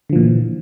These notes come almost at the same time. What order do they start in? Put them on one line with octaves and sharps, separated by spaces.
D3 F3 A#2 E3